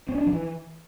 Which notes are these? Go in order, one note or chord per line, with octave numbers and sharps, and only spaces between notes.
C4
C#4
D4
F3
E3